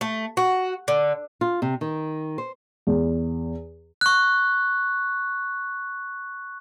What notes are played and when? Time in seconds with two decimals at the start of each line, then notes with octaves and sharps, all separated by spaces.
0.01 A3
0.37 F#4
0.88 D3
1.41 F4
1.62 C3
1.81 D#3
2.38 C5
2.87 E2
4.01 C#6 F#6